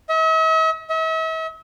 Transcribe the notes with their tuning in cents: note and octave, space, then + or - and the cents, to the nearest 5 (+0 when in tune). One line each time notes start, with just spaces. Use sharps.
E5 -45
E5 -40